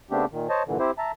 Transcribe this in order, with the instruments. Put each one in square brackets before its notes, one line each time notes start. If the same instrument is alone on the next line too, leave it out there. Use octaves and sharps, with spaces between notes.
[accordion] C#3 A3 B3 C4 D4 G4
A#2 D#3
C5 C#5 D#5 A5
G2 A#2 D3 E3
C4 E4 G4 C5
E5 A5 A#5